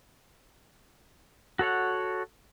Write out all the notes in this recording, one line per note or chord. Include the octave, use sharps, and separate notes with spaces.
F#4 A4 C#5 F#5